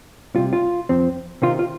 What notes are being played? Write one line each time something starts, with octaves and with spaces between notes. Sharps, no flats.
C2 C3 G3 F4
F4
F2 F3 C4
C3 D#3 C4 D#4 F4
F4